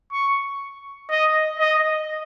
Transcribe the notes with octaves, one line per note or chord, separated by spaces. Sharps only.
C#6
D#5
D#5